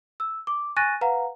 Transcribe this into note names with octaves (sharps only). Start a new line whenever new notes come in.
E6
D6
G#5 C#6 F#6 A6 A#6 D#7
B4 F5 F#5 A#5